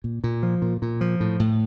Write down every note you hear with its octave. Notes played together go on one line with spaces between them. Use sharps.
A#2
A#2
F3
A#2
A#2
F3
A2
A2